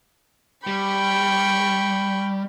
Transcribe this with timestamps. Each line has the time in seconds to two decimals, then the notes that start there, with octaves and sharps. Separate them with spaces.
0.67 G3 G5 B5 C#6